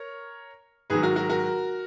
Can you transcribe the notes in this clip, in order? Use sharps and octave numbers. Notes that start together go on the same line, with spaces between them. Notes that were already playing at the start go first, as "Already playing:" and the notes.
Already playing: A#4 C#5
G#2 D#3 F#3 G#4 B4
F#4 A#4
F#4 A#4
F#4 A#4